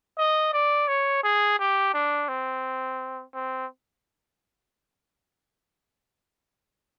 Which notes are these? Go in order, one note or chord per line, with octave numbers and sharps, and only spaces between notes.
D#5
D5
C#5
G#4
G4
D4
C4
C4